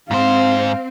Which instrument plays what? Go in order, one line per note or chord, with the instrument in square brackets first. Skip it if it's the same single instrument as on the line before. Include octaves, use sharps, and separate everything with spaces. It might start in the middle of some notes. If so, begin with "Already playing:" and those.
[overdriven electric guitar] G#2 C5 [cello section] C4 [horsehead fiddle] F5